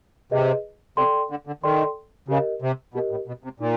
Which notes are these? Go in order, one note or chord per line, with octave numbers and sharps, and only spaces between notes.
C3 G#4 B4 D#5
C3 A4 D5 G5 C6
D3
D3
D#3 A4 D5 G5 C6
C#3 G4 A#4 D#5
C3
B2 G4 A#4 D#5
A2
B2
C3
A#2 D#4